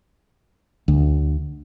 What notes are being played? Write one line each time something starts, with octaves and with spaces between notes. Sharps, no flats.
D2